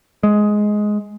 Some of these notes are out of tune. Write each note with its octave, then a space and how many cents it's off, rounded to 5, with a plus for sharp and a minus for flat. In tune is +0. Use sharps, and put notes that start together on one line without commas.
G#3 +10